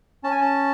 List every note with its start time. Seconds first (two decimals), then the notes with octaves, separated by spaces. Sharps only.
0.24 C#4 A5
0.32 G#5
0.41 A5